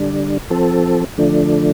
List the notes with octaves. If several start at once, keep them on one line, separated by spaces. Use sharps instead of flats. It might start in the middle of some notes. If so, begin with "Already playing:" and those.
Already playing: D3 G3 D4
F3 C4 A4
D3 F3 A3 D4